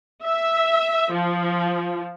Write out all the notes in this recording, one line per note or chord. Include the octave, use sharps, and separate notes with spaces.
E5
F3